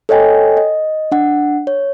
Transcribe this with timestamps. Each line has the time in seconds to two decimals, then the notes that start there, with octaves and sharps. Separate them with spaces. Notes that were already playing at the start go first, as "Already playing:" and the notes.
0.09 A4 C#5 D#5 G5 G#5
0.57 D#5
1.12 D4 F#5
1.67 C#5